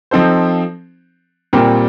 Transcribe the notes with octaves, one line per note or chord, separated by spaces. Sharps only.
F3 C4 D#4 A4 C5
A#2 G3 C4 G4 A#4